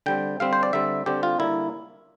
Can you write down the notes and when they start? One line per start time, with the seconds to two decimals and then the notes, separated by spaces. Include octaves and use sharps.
0.06 D3 G3 C4 G5
0.40 D3 G3 C4 F5
0.53 C5
0.63 D5
0.73 D3 G3 C4 E5
1.06 D3 G3 C4 G4
1.23 F4
1.40 D3 G3 A#3 E4